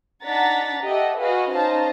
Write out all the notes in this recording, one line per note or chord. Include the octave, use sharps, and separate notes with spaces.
D4 D#4 F#5 A#5 A6 B6
G4 A4 D#5 E5 F#5
F#4 G#4 B4 D#5 F5
C#4 D#4 C5 F5 A5 A#5